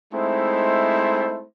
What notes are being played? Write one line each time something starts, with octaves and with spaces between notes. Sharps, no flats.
G#3 A3 C4 D#4 E4 C5